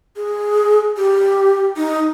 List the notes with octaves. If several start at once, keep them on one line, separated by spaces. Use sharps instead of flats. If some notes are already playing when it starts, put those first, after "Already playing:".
G#4
G4
D#4